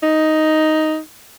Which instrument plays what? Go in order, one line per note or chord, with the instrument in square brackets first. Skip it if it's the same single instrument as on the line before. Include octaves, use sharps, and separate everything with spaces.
[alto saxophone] D#4